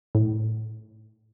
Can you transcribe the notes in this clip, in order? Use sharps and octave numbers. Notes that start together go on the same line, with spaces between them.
A2